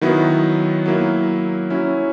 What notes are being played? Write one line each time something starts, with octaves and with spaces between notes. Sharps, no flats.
D#3 F#3 B3 E4
F#3 A#3 E4
F#3 C#4 E4